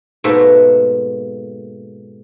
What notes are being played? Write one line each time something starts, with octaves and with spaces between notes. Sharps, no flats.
G#2 B2 A3 A#3 E5